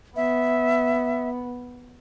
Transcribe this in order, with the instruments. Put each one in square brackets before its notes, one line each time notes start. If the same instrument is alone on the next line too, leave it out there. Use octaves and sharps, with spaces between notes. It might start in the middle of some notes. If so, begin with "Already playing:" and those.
[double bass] B3 [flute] E5